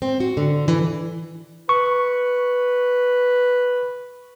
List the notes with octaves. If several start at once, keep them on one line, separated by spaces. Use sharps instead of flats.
C4
F#4
D3
E3
B4 C#6